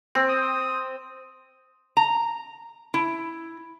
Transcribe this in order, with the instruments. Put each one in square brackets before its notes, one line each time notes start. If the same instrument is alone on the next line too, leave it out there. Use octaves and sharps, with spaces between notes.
[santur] C4
[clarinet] D#6
[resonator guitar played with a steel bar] A#5
E4